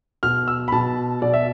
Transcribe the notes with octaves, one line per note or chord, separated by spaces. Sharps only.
B2 F6
E6
B5
B2 A5
B2 D5
E5